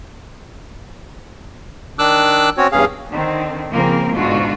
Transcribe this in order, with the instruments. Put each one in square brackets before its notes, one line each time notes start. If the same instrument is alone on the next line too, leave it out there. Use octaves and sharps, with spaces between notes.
[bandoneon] D#3 D4 D6 E6 F#6
C4 C#4 F#4 C#5
E2 G2 C#4 G#4 F5
[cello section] D3 D#3 C4
C#3 F3 A#3 C4 A#4
G#2 B2 D3 F4 F#4